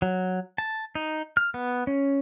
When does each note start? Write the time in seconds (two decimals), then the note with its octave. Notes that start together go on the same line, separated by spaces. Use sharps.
0.02 F#3
0.58 A5
0.95 D#4
1.37 F6
1.54 B3
1.87 C#4